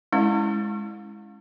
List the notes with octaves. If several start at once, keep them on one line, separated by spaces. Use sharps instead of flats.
G#3 C#4 E4